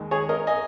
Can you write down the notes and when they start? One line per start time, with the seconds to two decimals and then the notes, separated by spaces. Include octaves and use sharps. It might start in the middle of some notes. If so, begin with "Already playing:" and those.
Already playing: D#2 D#3 G#3
0.11 G#4 C#5
0.29 A#4 D#5
0.47 D#5 G#5